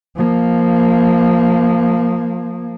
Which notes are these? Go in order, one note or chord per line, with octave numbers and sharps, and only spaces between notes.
F3 A#3